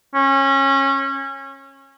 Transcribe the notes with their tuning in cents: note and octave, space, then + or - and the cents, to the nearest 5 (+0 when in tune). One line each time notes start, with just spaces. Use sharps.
C#4 -25